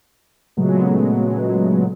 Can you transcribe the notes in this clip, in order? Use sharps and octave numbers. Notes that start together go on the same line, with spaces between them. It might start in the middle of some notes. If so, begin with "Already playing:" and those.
A#2 C#3 F#3 G#3 A3 B3